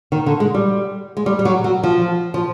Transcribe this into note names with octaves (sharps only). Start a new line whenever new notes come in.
D#3
D3
G#3
G3
G#3
G3
G3
F#3
F#3
F3
F3